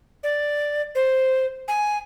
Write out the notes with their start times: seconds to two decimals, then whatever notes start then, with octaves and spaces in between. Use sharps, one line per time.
0.23 D5
0.95 C5
1.68 G#5